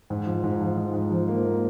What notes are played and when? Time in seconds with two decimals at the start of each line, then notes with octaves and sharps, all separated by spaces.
0.10 G#2
0.26 F3
0.44 G#2
0.61 F3
0.77 G#2
0.94 G#2
1.11 F3
1.28 A#3
1.45 A#3